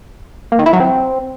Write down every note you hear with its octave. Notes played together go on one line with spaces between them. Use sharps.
A#3
D#3
E4
F#3
C4